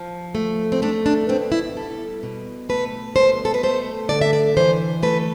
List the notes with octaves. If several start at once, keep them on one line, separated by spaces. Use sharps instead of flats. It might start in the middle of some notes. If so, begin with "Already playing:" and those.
Already playing: F3
A3
C4
A3 D4
D4
B2 C4
E4
G3 A4
B2
A3 B4
B2 C5
A4
B4
A3 C5
D3 D5
E5
D5
E3 C5
A3 B4